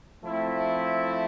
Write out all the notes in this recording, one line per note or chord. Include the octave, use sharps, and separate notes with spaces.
F3 A3 C4 E4